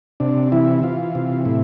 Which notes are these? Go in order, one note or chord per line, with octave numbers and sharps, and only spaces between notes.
C3 D4
E3 E4
E3 F4
C3
A2 E4